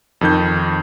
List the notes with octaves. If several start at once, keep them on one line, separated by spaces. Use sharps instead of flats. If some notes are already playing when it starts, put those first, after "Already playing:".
F2 D#3 G6